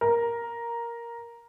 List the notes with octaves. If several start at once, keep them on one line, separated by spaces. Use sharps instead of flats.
A#4